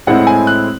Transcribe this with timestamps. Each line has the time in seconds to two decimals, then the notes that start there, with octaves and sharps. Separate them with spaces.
0.07 A2 G#3 C4 E4 F#5
0.27 G#5
0.47 F#6